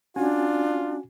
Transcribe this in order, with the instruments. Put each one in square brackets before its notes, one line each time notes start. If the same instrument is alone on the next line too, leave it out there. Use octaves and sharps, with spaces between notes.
[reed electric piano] C#4 F#4 G#5 [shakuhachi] D4 [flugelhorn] F4